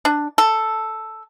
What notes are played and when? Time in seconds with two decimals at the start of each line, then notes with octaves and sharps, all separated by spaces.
0.05 D4
0.38 A4